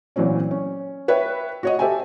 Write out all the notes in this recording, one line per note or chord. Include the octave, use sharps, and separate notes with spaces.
A#2 E3 F#3 C4 C#4
C#4
B4 C#5 E5 G5
F#4 C#5 D#5
G4 A4 C5 E5 G5 G#5